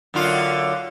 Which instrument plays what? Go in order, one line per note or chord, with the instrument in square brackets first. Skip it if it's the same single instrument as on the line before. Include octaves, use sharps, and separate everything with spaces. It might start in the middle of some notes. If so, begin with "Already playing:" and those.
[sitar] F#2 D3 F4